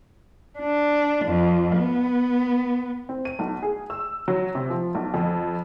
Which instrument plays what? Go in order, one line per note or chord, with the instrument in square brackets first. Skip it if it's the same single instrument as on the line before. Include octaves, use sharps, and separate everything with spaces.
[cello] D4
F2
B3
[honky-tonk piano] C4
D#7
B1
G#4
E6
F#3
C3
F3
B1
F2